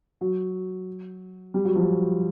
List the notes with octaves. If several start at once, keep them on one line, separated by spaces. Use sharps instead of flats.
F#3
G3
F#3
F3